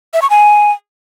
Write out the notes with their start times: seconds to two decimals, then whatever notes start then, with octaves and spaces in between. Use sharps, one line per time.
0.14 E5
0.22 C#6
0.30 G#5